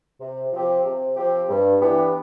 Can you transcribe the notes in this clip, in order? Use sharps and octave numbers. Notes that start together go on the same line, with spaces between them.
C3
F3 C4 G4
C3
F3 C4 G4
G2
E3 B3 D4 G4